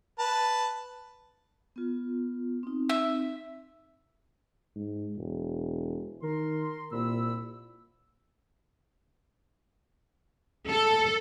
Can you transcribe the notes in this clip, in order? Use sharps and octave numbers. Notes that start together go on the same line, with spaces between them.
B4 A5
B3 F4
C4 D#4
E5
G#2
E1
D#3 A#4 C6
C2 A#2 B5 E6
A4